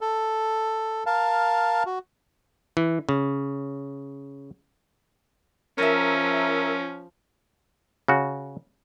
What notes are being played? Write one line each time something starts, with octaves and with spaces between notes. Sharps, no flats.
A4
A#4 F5 A5
F#4
E3
C#3
F3 C#4 A#4 E5
C#3 F#4